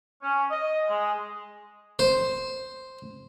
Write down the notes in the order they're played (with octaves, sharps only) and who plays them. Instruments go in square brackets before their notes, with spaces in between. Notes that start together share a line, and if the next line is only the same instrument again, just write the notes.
[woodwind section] C#4
D#5
G#3
[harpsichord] C5